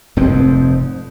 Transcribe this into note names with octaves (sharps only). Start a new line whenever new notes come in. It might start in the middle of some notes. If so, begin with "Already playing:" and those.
F1 F2 G#2 C4